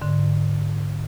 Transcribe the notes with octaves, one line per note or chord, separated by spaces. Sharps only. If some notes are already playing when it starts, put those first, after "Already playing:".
G#2 D3